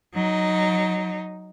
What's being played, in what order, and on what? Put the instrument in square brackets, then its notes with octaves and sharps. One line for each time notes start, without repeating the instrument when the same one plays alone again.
[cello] F#3 D#4